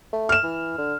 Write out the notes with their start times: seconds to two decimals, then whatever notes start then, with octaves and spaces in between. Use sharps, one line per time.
0.13 A3
0.29 F6 E7
0.44 E3
0.78 D3